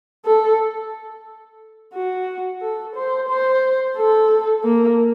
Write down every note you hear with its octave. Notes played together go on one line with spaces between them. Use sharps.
A4
F#4
A4
C5
C5
A4
A#3